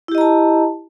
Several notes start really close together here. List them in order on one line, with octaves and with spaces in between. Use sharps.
E4 G4 D#5 A#5 A5